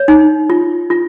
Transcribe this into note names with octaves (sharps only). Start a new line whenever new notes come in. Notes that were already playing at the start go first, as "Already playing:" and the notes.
Already playing: C#5
D#4
F4
F4